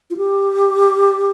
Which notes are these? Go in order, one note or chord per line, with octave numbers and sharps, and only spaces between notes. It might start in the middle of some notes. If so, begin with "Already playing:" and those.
F4
G4